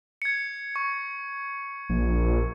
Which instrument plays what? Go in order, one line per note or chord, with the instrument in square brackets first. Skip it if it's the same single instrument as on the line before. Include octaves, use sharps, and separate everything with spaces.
[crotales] G#6 C#7
C#6
[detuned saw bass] A#1